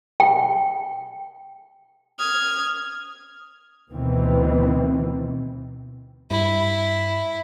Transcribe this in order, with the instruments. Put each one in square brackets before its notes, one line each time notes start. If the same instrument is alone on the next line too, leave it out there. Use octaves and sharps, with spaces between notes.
[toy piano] G5
[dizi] D#6 [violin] F6 G#6
[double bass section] D2 B2 D#3 E3 B3 C4
[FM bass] G2 [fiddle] E4